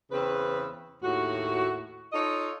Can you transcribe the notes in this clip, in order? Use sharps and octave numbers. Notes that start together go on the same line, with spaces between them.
E2 C#3 C4 B4
D#2 A2 F#4
D#4 F4 A4 C#5 D#5